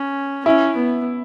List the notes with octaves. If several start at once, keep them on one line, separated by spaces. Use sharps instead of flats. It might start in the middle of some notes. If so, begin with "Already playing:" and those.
Already playing: C#4
C#4 E4
B3